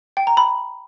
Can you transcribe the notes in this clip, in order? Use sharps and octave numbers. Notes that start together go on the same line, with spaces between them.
G5
A#5
B5